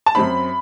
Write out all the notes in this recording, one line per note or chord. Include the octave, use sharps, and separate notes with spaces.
A5
F#2 F#3 C4 B5